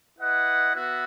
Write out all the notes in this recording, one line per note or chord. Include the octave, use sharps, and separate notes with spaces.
E4 B4 D#5 F#5
B3 F#4 B4 E5